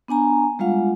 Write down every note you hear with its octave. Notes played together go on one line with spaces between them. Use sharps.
B3 D4 G#5 A#5
G3 G#3 F4 F5 F#5